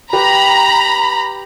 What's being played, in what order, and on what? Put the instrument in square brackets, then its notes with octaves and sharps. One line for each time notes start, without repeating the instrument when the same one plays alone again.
[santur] G4 B4 [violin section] A#5 B5